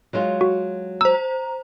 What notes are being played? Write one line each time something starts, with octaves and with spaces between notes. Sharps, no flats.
F#3 G#3 F4
F#4
C5 A#5 E6